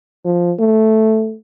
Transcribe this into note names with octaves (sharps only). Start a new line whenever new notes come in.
F3
A3